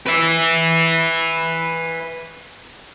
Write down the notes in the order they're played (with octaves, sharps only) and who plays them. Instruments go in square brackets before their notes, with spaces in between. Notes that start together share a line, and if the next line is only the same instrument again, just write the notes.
[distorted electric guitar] B4 E5